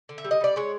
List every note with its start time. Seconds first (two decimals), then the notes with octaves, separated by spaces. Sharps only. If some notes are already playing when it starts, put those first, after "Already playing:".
0.09 D3
0.18 E5
0.24 G3
0.31 D#5
0.41 G3 D5
0.56 G#3 C#5